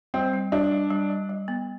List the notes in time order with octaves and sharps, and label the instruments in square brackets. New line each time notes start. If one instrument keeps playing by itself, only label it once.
[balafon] G3 [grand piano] C4
[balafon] G3
[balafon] G3 [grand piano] D4
[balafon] G3
G3
G3
G3
B3